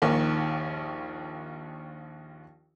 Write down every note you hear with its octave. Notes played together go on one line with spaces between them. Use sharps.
A#1 D#2 D#3